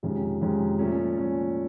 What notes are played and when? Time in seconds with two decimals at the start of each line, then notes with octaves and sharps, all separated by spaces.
0.03 F2 C3 D#3 G#3 C#4
0.41 F2 C3 D#3 G#3 C#4
0.79 A#2 F3 A3 C#4
1.17 A#2 F3 A3 C#4